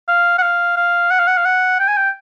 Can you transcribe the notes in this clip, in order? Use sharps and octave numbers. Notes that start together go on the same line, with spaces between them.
F5
F#5
F5
F5
F#5
F5
F#5
F5
F#5
G5
G#5
G5